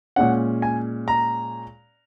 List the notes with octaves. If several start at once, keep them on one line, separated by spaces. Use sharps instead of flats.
A#2 G#3 C#4 F#5
G#5
A#5